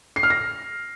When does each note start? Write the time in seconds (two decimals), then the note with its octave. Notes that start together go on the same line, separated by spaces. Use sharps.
0.16 C7
0.23 F6
0.30 A#6